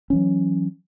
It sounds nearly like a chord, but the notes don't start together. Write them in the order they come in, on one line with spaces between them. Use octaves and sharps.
C#4 E3 F#3